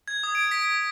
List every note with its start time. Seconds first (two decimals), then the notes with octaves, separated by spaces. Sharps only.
0.08 G#6
0.23 D#6
0.35 D7
0.51 B6